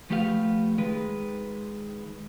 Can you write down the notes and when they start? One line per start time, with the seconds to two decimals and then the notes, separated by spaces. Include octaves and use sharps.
0.10 F3 A3 B3 G4 D5 F5
0.78 D#3 G#3 B4